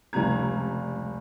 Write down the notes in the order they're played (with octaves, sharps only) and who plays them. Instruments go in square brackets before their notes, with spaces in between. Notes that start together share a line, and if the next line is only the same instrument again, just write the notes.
[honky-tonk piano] F1 C#2 G3 A#5 G#6